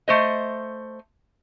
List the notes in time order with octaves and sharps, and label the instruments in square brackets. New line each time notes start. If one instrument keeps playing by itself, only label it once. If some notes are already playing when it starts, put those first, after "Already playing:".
[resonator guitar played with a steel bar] A3 C5 D#5